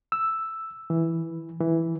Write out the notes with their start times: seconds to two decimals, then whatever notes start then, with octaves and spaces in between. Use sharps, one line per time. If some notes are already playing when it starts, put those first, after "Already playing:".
0.12 E6
0.90 E3
1.61 E3